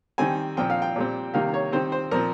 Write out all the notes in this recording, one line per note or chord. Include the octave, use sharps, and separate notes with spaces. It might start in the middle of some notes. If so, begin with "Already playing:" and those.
D#3 G3 C4 G#5
A#2 F3 C4 G5
F5
G5
A#2 G3 C4
C3 D#3 G3 A#3 F5
C#5
D#3 G3 C4 C5
C5
A#2 F3 C4 A#4